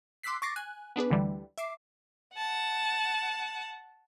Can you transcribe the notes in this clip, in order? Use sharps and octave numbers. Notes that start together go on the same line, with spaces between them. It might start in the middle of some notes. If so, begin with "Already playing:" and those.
C6 D6 E6 F#6 B6 C7
C#6 D6 A6 A#6 C7
G#5 F#6
B3 D4 G#4 B4
D2 D3 E3 G3
E5 D6 C7
F#5 A5